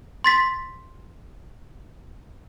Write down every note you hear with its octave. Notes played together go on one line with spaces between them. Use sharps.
C6 A6 B6